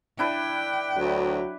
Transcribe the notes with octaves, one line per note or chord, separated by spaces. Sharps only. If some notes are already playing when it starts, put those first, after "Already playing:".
D4 E4 B4 G5
D2 F#3